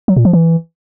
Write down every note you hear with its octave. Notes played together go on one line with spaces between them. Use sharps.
F#3
A#2
F3
E3